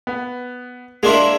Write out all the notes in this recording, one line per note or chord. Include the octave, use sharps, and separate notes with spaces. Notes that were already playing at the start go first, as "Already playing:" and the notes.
B3
G#3 A#3 D4 E4 C6